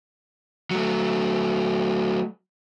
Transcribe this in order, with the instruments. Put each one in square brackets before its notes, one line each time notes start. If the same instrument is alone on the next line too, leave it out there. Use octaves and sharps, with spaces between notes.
[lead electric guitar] F#3 A3